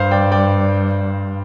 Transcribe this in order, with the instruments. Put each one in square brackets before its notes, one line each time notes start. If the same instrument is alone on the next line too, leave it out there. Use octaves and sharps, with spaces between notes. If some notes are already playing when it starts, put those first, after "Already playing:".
Already playing: [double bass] G2 [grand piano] C5 F5
[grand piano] D5 G5
D5 G5